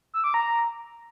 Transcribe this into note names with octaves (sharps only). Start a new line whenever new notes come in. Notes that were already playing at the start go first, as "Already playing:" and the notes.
E6
D6
A#5